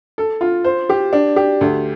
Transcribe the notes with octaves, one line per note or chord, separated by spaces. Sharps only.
A4
F4
C5
G4
D4
G4
D2